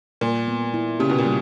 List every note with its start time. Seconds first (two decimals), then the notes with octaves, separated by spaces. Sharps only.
0.21 A#2 G3
0.48 B3
0.74 E4
1.00 C#3 G4
1.10 B2
1.18 A#2
1.26 G3